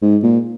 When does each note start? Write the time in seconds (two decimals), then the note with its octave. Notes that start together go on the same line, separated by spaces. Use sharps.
0.02 G#2
0.23 A#2